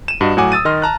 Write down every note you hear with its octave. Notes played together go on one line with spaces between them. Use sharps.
D#7 E7
G2 F#4 D#5
A2 F#3 F#5 G#5 D6
D#6 E6 A6 D#7
D#3 D#5 C6 F6
A5 A#5 F#6